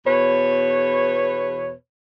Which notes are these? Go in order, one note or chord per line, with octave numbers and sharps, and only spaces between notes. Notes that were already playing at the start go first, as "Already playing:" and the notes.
E2 B2 B4 C#5